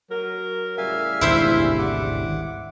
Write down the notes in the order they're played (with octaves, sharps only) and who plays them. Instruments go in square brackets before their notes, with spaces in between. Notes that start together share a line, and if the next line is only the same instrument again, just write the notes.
[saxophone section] F#3 A#4
[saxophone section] A2 C#3 G3 [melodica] E5 F5 G#5
[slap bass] G#1 D2 B2 [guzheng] E4 C5
[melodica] F#5 D6